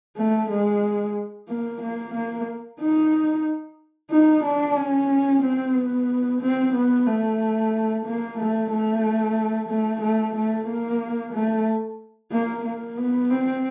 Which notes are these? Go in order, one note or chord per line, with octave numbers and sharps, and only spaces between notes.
A3
G#3
A#3
A#3
A#3
D#4
D#4
D4
C#4
C4
B3
C4
B3
A3
A#3
A3
A3
A3
A3
A3
A#3
A3
A#3
A#3
B3
C4